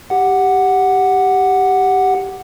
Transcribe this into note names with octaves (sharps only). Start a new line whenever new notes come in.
G4 F#5